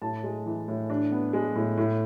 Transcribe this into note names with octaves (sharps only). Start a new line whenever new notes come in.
A2 A5
G#3
E3
A2
D4
B3
G#3
A2
A2